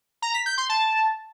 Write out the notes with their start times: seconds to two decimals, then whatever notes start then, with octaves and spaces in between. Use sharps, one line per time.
0.22 A#5
0.34 B6
0.46 G6
0.58 C6
0.69 A5